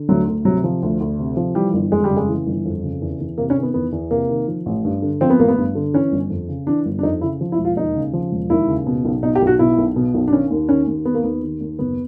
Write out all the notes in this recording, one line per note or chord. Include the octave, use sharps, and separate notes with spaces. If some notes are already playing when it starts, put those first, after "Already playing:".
Already playing: D3
D2 F#3
D2
C3 F#3
F3
D2
D2
C3
F3
E3 G3
G1
F2 G#3
G3
C#3
G#3
E3
G1
F2
C#3
E2
E2
C3 A#3
C#4
D#3
B3
E2 B3
E2
C3 A#3
D#3
F3
A1
G2
D3
F3 C4
B3
A1 A#3
B3
G2
D3
E3 C#4
G1
F2
C#3
E3 D4
G1
D4
F2 D#4
C#3 E4
F3
E4
E1
F4
D#2 D#4
C#3
F3
E1
D#2 E4
C#3
B2
B1
B2 D#4
G4
B1
F#4
B2 E4
B1
B2
B1
D4
D#3 C#4
D#2
D#3 C#4
D#2
D#3 B3
A#3
D#2 B3
D#3
D#2
F#1 B3